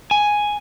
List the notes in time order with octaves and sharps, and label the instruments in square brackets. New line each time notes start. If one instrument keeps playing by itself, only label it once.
[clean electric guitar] G#5